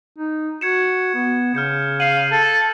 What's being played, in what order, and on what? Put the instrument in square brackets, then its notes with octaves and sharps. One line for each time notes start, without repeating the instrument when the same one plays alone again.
[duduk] D#4
[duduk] F#4 [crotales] G#6 C#7 E7
[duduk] B3
[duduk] C#3 [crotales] F6 G6 C#7
[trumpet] F5 [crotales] D#7 F#7
[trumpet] A4